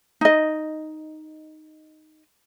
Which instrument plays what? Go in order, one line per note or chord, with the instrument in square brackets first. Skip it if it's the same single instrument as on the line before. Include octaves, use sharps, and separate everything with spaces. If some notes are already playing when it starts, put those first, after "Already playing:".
[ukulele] D#4 D#5